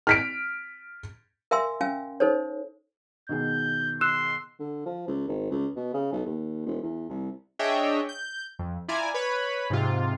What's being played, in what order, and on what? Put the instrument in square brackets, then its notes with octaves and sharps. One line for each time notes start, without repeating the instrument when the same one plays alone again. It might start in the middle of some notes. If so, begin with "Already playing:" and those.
[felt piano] F6 B6 D7
[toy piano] A#4 E5 F5 G#5 C6 E6
C#4 F5 G#5
D#4 A4 C5 C#5
[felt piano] B2 D#3 G#4 [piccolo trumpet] G6
[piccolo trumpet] C6 [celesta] E6 F#6 E7
[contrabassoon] D3
F3
C#2
G#1
C#2
B2
C#3
B1
D#2
E1
E2
C2
[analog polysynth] D4 G#4 C#5 D#5 E5 G5
G6
F2
E4 F4 D5 G#5 A#5
B4 C#5 B5
G#2 C3 F4